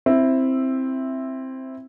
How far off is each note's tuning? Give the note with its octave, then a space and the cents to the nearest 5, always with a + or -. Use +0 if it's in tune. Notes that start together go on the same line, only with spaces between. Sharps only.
C4 +5 E4 +0 E5 +0